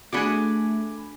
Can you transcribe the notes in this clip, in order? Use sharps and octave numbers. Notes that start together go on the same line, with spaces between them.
A3 D4 F#4 G#4 G#5 B5 D6